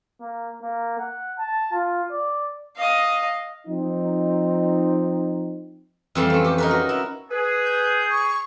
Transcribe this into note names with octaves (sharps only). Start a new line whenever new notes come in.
A#3
A#3
F#5
A5
F4
D5
D#5 F5
F3 C4 D#4
F2 E3 G3 C4
A3 C#4
G4
D#4 A#4 B4
F#4
E4
G#4 B4
G6
C#6